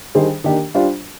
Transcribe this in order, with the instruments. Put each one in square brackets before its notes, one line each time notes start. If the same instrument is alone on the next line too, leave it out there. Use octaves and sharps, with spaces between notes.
[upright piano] D#3 G3 D4 G#4 C5
D#3 A#3 D4 G4
G3 D4 F4 C5 F5